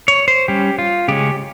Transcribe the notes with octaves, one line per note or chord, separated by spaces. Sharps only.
C#5
C5
G3 C#4 G4
F4
C#3 G#3 C#4 G4